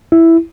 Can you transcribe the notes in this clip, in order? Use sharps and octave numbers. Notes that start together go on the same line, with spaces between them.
E4